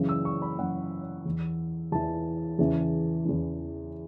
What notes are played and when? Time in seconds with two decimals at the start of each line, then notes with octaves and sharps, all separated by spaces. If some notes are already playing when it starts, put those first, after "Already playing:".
Already playing: F#2 C#3 E3
0.09 E6
0.25 C#6
0.42 B5
0.59 F#2 C#3 E3 F#5
1.25 E2 E3
1.92 E2 E3 A5
2.59 E2 C#3 E3
3.25 E2 C#3 E3